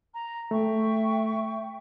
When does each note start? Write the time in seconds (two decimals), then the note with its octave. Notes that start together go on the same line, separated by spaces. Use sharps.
0.14 A#5
0.51 A3 E5 G5 C#6